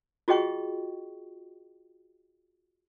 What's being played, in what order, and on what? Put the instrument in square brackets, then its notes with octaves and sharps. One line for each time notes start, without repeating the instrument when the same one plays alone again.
[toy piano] F4 F#4 G#4 D#5 G5 C#6